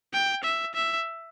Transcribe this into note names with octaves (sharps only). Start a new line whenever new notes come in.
G5
E5
E5